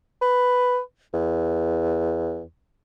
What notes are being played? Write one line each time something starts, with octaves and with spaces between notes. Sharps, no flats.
B4
E2